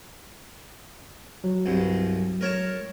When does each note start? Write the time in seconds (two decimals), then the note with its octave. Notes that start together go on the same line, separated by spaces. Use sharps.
1.44 F#3
1.66 C2 G2
2.41 A#4 C#5 A5